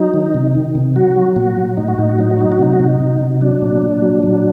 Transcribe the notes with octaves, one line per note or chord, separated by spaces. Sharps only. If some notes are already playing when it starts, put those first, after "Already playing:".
Already playing: F#3 D#4
D#3
C3
D#3
C3
F#3 F#4
F#3
A#2 F#4
F#3
A2 D#4
F#4
A2 D#4
F#4
F#3 D#4
F#4
F#3 D#4
F#4
C3 D#4
F#4
C3 D#4
C3
C3
F#3 D4
A#2
A#2
F#3
F#3